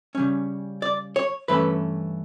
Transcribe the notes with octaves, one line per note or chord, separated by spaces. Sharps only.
C#3 G3 C#4
D5
C#5
G2 E3 A3 C#4 B4